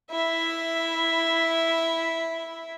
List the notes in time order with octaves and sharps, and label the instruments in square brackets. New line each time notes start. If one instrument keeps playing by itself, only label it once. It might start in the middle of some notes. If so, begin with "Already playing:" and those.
[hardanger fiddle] E4 E5